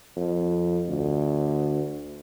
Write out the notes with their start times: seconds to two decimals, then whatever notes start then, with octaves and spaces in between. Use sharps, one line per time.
0.17 F2
0.89 D2